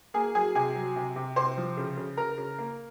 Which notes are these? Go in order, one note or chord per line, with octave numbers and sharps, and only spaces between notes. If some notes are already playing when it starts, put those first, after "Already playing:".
A#3 G#4 G#5
F#3 G#4 G#5
C3 G#4 G#5
F#3
C3
C3
C3 C5 C6
F3
C#3
C#3
C#3 A#4 A#5
C#3
A#3